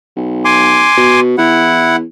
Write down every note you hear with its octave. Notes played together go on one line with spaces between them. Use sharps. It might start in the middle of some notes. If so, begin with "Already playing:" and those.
B1
G#5 C6 D6
B2
E2 E4 F#5